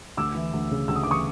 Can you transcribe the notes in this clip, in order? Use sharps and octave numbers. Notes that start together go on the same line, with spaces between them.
D2 D6 E6
E3
D2
C#3
D2 E6
D#6
E3 D6
C#6 D#6